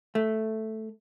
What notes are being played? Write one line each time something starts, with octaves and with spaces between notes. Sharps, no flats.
A3